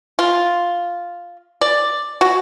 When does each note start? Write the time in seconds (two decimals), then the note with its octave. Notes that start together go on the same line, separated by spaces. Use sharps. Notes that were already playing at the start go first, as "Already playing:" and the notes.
0.19 F4
1.61 D5
2.21 F#4